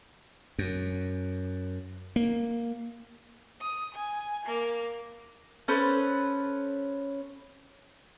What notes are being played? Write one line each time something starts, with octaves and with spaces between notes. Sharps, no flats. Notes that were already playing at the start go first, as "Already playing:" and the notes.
F#2
A#3
D#6
G#5
A#3
C#4 A4 B4 C5